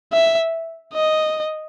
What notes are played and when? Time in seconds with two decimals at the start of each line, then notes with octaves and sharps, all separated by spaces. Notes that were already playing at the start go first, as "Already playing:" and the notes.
0.13 E5
0.94 D#5